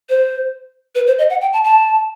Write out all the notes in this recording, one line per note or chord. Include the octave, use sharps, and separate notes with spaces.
C5
B4
C5
D#5
F#5
G5
A5
A5